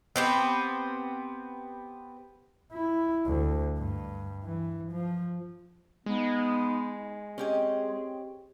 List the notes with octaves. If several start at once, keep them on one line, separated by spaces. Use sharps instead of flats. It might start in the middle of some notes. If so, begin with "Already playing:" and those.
B3 C4 G4
E4
D2
G2
E3
F3
G#3 B3 D#4
C4 C#4 G4 G#4 D#5